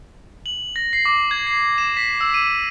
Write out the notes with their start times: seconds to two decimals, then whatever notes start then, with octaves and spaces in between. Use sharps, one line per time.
0.46 F#7
0.76 A#6
0.93 C7
1.05 D6
1.31 G#6
1.47 C7
1.78 E7
1.97 B6
2.21 E6
2.34 D#7